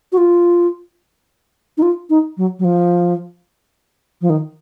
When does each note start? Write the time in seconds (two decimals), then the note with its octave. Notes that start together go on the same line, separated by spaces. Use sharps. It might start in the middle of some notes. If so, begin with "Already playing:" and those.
0.12 F#4
0.17 F4
1.78 D#4
1.82 F4
2.10 D#4
2.37 F#3
2.59 F#3
2.64 F3
4.21 F3
4.30 D#3